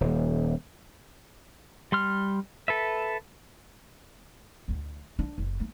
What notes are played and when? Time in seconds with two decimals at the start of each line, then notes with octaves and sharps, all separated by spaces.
0.01 D#1
1.92 G3 C6 F6
2.68 A4 B4 E5
4.68 D2 D3
5.19 D4
5.38 F#1
5.60 A3 A#3